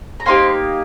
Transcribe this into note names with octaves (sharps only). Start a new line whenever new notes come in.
A#5
A#3 D#4 G4 C5 C6